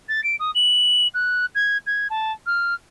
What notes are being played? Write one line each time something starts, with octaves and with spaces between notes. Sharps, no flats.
A6
D7
D#6
F#7
F#6
G#6
G#6
A5
F6